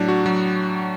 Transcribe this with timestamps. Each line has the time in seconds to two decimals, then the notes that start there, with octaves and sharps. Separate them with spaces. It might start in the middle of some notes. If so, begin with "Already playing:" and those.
Already playing: A2 F#3 D4
0.08 F#4
0.26 F#3